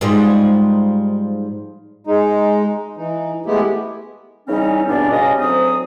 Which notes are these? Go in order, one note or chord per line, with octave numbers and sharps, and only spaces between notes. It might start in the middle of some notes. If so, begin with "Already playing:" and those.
G#2 F3 G3
G#3 D#4
E3 D#4
G#3 A3 B3 E4 G4
C#3 E3 G3 C4 C#4 D#4
E2 G2 B2 B3 C#4 D4
G2 C#3 C#4 D#5
D2 G#2 F#3 C4 D#6